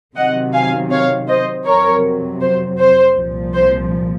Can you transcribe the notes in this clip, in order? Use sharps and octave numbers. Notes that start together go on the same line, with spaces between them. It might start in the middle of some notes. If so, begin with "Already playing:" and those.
C3 D#3 F#3 D#5 F#5
F5 G#5
C#5 F5
C5 D#5
F2 C3 F#3 A#4 C#5
C5
C5
C2 A#2 F3
C5